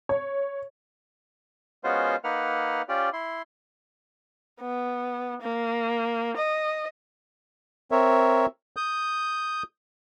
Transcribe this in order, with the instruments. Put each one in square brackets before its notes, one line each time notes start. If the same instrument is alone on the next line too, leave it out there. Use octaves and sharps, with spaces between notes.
[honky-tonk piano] C#5
[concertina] G#3 B3 C#4 F4 F#4 C5
A#3 D#4 B4 F#5 F6
C#4 F4 G4 D5
E4 C6
[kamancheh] B3
A#3
D#5
[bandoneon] C4 A#4 C#5 E5
D#6 G6